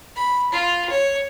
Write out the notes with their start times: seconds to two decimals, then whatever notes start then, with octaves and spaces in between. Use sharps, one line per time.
0.16 B5
0.52 F4
0.90 C#5